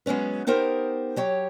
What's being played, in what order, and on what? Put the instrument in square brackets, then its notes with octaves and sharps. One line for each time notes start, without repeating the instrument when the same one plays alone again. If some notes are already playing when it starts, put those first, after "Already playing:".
[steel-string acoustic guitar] F#3 G#3 B3 C#4 B4
B3 D#4 G4 A#4 C5
F#3 G4 C#5